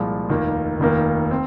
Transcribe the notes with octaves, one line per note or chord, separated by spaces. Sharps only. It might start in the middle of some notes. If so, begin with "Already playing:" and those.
Already playing: C2 A#2 F3 G#3
F1 D#2 D#3 A#3
F1 D#2 D#3 A#3
C4